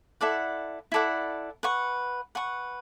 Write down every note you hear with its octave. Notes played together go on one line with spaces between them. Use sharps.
E4 A4 D5 F#5
E4 A4 D5 F#5
B4 F#5 C#6
B4 F#5 C#6